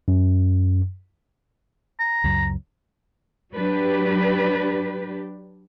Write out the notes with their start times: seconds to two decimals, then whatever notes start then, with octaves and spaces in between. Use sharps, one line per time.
0.08 F#2
1.99 A#5
2.24 C#2 F#2
3.52 F#3 D4 G4 B4